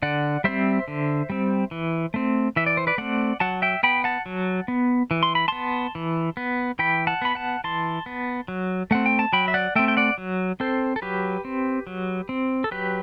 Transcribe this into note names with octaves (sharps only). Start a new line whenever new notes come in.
D3 D5 F#5
G3 C4 C5 E5
D3
G3 C4
E3
A3 C4
E3 E5
D5
C5
B4 D5
A3 C4 D5 F#5
F#3 F#5 A5
E5 G5
B3 G5 B5
F#5 A5
F#3
B3
E3
C6
B5
B3 A5 C6
E3
B3
E3 G5 B5
F#5 A5
B3 B5
F#5 A5
E3 A5 C6
B3
F#3
A3 C4 F#5
G5
A5
F#3 G5 B5
E5
D5 F#5
A3 C4 E5 G5
G5
D5 F#5
F#3
C4 A4 C5
A4
F#3 G4 B4
C4
F#3
C4
A4
F#3 G4 B4